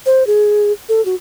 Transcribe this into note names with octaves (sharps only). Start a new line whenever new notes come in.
C5
G#4
A4
F#4